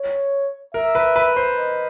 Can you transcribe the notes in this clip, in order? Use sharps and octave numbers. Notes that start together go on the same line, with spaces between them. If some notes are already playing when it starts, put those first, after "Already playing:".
Already playing: C#5
A#4 E5
B4
B4
C5
D#5